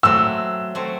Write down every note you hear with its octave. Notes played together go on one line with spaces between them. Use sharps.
F#3 A3 C4 E6
F#3 A3 C4